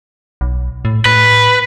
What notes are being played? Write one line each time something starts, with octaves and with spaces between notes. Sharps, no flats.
B1
A2
A2 B4